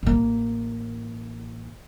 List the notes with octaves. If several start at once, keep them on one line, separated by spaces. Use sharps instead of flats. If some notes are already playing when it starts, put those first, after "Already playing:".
A1 A#3